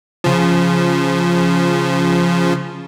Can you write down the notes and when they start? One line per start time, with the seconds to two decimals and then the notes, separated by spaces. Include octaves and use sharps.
0.24 C#3 F3